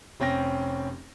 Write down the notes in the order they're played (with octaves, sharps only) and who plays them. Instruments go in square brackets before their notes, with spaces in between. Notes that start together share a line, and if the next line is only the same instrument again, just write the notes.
[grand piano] F1 C4 C#4 G5 A#6